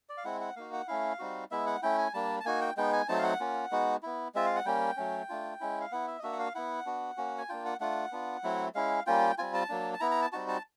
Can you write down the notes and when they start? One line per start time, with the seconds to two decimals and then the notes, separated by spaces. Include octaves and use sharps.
0.09 D5
0.18 F5
0.25 G#3 C4 E4 F#5
0.41 F#5
0.56 A#3 D#4 F#4 F5
0.73 F#5
0.88 A3 C#4 E4 F5
1.19 G3 C4 D#4 F#4
1.51 G#3 B3 E4 E5
1.66 F#5
1.82 A3 C#4 E4 G5
1.98 G#5
2.14 G3 A#3 D4 A5
2.40 A5
2.45 A#3 D#4 F#4 G#5
2.61 G5
2.77 G#3 B3 D#4 G5
2.93 G#5
3.08 F#3 A3 C4 D#4 A5
3.19 F5
3.24 F#5
3.40 A#3 C#4 F4
3.72 G#3 B3 D#4 F#4
4.03 B3 E4
4.35 G#3 C4 F4 E5
4.46 F5
4.56 F#5
4.66 G3 A#3 C#4 G5
4.97 F#3 A3 C#4
5.29 A3 D4 F4
5.61 G#3 C#4 E4
5.81 F5
5.92 B3 E4 F#5
6.08 E5
6.19 D#5
6.23 A#3 D4 F#4 E5
6.32 F#5
6.39 F5
6.55 B3 E4 F#5
6.86 B3 D4 F#4
7.17 A#3 C#4 F#4
7.38 G#5
7.49 A#3 D4 F4 G5
7.65 F#5
7.80 A3 D4 F4 F#5
8.12 B3 D4 F4
8.44 F#3 A3 C4 E4
8.75 G#3 C#4 E4 F5
9.06 G3 A#3 C#4 F4 G5
9.38 G3 C4 F4 G#5
9.54 A5
9.69 F#3 A#3 D4
9.94 A5
10.00 B3 E4 A#5
10.11 A#5
10.22 A5
10.32 G3 C4 D#4 F#4 A5
10.48 A5